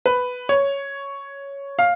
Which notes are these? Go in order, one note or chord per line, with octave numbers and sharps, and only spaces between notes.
B4
C#5
F5